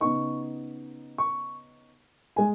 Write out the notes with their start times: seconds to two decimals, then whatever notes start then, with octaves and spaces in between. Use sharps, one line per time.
0.01 C#3 B3 D#4 C#6
1.18 C#6
2.36 G#3 G#5